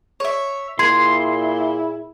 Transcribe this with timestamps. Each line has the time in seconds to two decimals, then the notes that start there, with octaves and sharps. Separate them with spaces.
0.20 C#5 E5
0.79 A#2 E4 G#4 C6